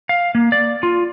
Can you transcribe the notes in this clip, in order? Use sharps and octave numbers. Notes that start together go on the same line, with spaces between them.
F5
A#3
D5
F4